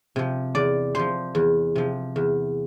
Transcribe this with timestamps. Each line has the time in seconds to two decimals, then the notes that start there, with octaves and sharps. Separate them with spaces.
0.16 C3 F3
0.55 E2 D5
0.95 C3 F3 C5
1.35 E2
1.76 C3 F3
2.16 E2